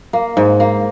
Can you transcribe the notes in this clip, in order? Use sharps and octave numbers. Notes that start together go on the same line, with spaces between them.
A#3
G#2
A#3